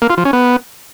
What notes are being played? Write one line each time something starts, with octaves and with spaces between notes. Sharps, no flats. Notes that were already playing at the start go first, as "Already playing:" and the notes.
A#3
F4
F3
C#4
B3